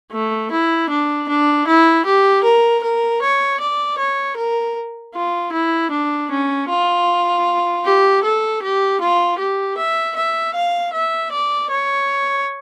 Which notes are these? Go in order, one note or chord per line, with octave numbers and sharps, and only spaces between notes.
A3
E4
D4
D4
E4
G4
A#4
A#4
C#5
D5
C#5
A#4
F4
E4
D4
C#4
F4
G4
A4
G4
F4
G4
E5
E5
F5
E5
D5
C#5